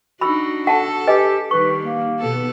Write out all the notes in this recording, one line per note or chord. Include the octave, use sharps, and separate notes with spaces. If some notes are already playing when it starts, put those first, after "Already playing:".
D4 D#4 F#4 B5 E6
A4 F#5 A5
G4 B4 D#5 G#5
D#3 G3 B4 C#6
A#3
B2 B3 A4